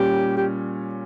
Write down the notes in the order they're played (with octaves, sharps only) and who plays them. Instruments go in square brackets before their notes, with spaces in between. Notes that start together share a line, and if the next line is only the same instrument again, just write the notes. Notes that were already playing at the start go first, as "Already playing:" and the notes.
Already playing: [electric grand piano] A#2 G3 C#4 [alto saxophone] G4
[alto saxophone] G4